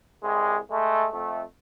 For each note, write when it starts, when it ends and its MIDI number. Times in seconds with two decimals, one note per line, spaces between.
0.23 0.57 36
0.23 0.57 56
0.71 1.06 56
0.71 1.06 57
1.12 1.41 41
1.12 1.41 57